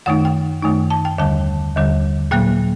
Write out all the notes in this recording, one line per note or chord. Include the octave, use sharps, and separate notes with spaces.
F#2 D#3 A3 D#4 F#5
G5
F#2 D#3 A3 D#4
A5
G5
D#2 D3 G3 A5
D#2 D3 G3
A#2 F#3 A#3 G5